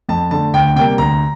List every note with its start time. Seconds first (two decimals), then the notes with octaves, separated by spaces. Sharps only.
0.09 F2 A5
0.31 D3 A3 A5
0.54 D2 G5
0.76 C3 G3 A#3 G5
0.98 D2 A#5